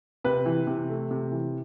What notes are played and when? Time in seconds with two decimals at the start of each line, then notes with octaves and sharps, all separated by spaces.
0.24 C3 B4
0.46 E3
0.67 C3
0.89 A3
1.11 C3
1.32 E3